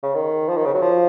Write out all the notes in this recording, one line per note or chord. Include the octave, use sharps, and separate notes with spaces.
C#3
D#3
F3
D#3
C#3
F#3
F3